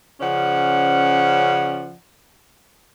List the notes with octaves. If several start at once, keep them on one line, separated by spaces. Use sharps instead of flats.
C#3 F3 C#4 D5 F#5